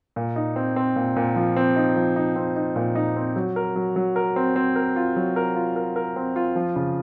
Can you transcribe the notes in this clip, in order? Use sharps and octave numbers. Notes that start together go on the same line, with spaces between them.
A#2
D#4
C4
C4
A#2
A#2
F3
C4
D#4
F3
D#4
C4
D#4
A#2
D#4
C4
F#3
A#4
F#3
F#3
A#4
C4
C4
A#4
F4
F#3
A#4
F4
A#4
A#4
C4
F4
F3
C#3